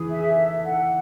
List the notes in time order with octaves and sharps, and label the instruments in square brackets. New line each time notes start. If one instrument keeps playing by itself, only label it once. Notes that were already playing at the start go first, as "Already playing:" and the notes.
Already playing: [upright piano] E3 [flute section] G#4
[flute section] E5
A4
F#5